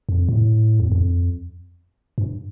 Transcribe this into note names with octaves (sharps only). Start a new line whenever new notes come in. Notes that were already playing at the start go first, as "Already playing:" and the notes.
F2
A2
E2
F2
G2